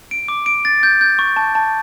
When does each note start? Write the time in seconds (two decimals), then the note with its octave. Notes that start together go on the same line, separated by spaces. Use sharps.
0.11 D7
0.28 D6
0.46 D7
0.65 A6
0.83 G6
1.01 G6
1.19 C#6
1.36 A5
1.55 A5